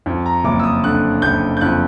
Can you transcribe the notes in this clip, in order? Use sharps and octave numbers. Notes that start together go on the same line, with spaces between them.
F2
A#5
F#1 D6
E6
D#6
D3 F#6
F#1 G6
G6
F2 F#6